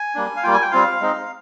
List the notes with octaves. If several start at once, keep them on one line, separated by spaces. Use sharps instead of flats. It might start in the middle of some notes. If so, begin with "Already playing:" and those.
Already playing: G#5
G3 A#3 D4
F5
G3 A#3 F4 G5
G#5
G5
G3 C4 F4 F5
G#3 C4 D#4